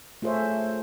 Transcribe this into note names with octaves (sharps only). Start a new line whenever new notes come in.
A3 F4 G#4 C5 C#5 E5